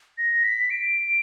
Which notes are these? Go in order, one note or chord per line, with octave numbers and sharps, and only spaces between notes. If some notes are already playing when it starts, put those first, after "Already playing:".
A#6
B6
D7